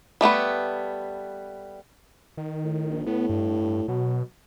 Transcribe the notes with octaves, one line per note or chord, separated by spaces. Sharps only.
G3 A3 B3 B4
D#3
A2
A#1
A2 B3
G2
B2 F#3